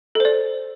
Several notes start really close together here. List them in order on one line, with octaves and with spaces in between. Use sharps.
A4 C5 D5